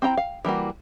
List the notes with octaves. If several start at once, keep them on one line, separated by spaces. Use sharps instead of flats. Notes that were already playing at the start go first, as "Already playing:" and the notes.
C4 E4 G5 A#5
F5
E3 G3 A#3 F#4